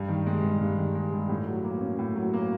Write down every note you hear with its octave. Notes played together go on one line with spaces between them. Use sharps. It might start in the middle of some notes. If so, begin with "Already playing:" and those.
Already playing: G2
D#3
G#3
G2
G2
D#3
G#3
G2
A2
F#3
A#3
C#4
A2
F#3
A#3